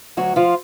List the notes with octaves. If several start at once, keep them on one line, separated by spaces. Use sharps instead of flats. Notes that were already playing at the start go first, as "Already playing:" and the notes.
D2 F#3 F#4
F3 F4